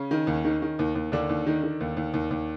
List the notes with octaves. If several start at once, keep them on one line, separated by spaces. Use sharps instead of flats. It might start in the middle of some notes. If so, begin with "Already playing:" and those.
Already playing: C#3 C#4
D#3
D#2
D#3
D#3
D#2
D#2
D#2 D3 D4
D#2
D#3
D#3
D#2
D#2
D#2
D#2